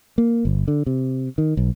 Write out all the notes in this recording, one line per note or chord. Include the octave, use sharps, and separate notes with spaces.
A#3
G1
D3
C3
D#3
B1